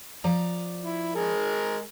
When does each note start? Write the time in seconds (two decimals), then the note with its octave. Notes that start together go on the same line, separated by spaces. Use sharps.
0.24 F3 D5 A#5
0.84 E4
1.15 G#3 G#4 A#4